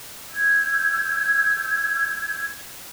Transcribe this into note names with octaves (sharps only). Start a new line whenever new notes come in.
E6 G6 G#6